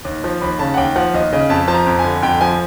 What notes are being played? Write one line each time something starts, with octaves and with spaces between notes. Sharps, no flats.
D#2
F3
D#2 B5
C#3 A5
F#5
D#2 G5
F3 F#5
D#2 D#5
C#3 D#5
F2 A5
F3 A5
A#5
F2
D3 G#5
F2 G5
F3 G#5